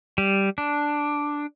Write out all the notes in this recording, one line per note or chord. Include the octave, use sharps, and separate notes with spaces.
G3
D4